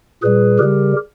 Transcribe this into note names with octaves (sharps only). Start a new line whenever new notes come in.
A#2 G3 G#4 B4
C#3 G3 G4 A#4